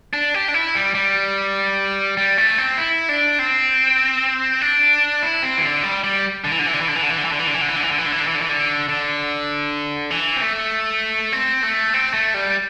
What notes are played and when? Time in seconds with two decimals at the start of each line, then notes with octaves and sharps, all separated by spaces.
0.13 D4
0.34 G4
0.48 D4
0.54 E4
0.75 G3
0.95 G3
2.17 G3
2.38 A3
2.58 C4
2.78 E4
3.09 D4
3.39 C4
4.62 D4
5.22 E4
5.42 C4
5.58 E3
5.63 D3
5.83 G3
6.04 G3
6.44 D3
6.51 E3
6.59 D3
6.66 E3
6.74 D3
6.81 E3
6.88 D3
6.96 E3
7.03 D3
7.10 E3
7.18 D3
7.25 E3
7.32 D3
7.39 E3
7.47 D3
7.54 E3
7.61 D3
7.69 E3
7.76 D3
7.83 E3
7.91 D3
7.98 E3
8.06 D3
8.12 E3
8.20 D3
8.27 E3
8.35 D3
8.42 E3
8.49 D3
8.89 D3
10.10 E3
10.36 C4
10.42 A3
11.32 C4
11.63 A3
11.93 C4
12.14 A3
12.34 G3